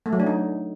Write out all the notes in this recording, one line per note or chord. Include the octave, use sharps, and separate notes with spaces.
A3
F#3
D4
D#4